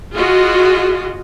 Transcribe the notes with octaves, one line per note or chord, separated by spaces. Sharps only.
F4 F#4 G#4 D#5